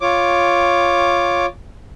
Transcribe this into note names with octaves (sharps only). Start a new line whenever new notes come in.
F4 C#5 D6